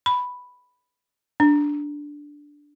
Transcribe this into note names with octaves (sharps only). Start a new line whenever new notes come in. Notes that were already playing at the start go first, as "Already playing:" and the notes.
B5
D4